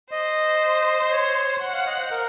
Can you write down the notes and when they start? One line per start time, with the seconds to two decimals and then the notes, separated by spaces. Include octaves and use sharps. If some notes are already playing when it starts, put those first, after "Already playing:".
0.11 C5 D#5
1.11 C#5
1.61 F#5
1.74 F5
1.86 D#5
1.98 C5
2.11 A#4